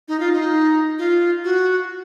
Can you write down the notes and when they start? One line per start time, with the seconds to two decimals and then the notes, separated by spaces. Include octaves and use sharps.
0.08 D#4
0.20 F4
0.33 D#4
0.98 F4
1.44 F#4